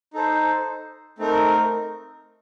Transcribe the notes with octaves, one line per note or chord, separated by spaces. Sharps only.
D#4 A4 C5
A3 C4 D#4 A#4